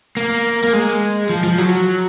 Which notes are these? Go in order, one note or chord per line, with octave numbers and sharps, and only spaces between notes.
A#3
A#3
G#3
F3
F3
F#3